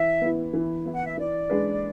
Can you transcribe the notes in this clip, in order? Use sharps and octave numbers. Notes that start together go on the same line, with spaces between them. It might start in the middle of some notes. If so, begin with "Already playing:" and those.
Already playing: E3 E5
B3 E4
E3
B3 E4
F#5
E5
E3 D5
G#3 D4 G#4 B4